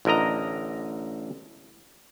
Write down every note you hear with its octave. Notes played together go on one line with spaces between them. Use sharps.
A1 D3 A#4 D#5 A#5